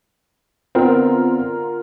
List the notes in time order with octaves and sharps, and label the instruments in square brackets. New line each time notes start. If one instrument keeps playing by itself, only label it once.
[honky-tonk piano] D3 F4 A#4 [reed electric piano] B3 C4